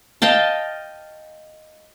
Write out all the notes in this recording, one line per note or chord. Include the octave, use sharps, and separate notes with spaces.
D#5 F5 G5 A5